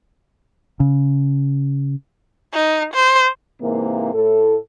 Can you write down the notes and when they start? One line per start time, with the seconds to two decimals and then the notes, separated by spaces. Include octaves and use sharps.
0.80 C#3
2.54 D#4
2.94 C5
3.61 G#2 C3 E3 A#3
4.14 A2 A4